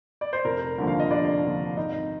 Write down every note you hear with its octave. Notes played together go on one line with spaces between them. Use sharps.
D5
C5
F1 A#4
D#2 D3 F3
F5
D#5
F1 D4 D5
D#2 D3 F3
G#1 D#4 D#5